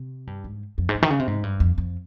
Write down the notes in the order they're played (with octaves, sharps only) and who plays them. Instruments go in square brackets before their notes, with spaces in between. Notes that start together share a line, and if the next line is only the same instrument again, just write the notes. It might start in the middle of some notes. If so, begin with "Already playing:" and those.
Already playing: [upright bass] C3
G2
G#2
F2
G#2
G2
D#3
C#3
C3
G#2
G2
F2
F2